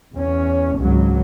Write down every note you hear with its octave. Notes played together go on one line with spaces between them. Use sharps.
E2 C#4
G#1 C#2 G#2 F#3